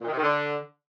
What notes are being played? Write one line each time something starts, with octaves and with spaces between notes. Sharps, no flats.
A#2
D#3
C3
D#3
D3